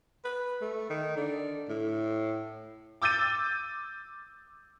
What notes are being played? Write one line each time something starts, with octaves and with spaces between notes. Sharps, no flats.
B4
A3
D#3
D3
A2
D6 E6 G6 A6 D#7